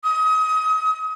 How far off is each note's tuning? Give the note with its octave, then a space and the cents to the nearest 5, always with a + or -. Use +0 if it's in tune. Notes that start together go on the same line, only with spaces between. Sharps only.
D#6 +30